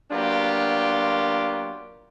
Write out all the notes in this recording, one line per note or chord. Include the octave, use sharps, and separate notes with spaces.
F#3 A#3 B3 D4 F4 G4